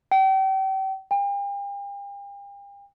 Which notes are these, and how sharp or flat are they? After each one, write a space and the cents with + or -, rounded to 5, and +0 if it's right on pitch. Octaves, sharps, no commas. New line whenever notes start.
G5 -35
G5 +40